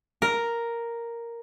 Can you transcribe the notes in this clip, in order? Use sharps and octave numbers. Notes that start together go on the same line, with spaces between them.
A#4